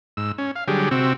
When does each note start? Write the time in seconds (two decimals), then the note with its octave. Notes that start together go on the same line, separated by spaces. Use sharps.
0.17 G#2 E6
0.38 C#4
0.56 F5
0.68 D3 F#3 G3 G4 G#4
0.91 C3 C4 F#4 E6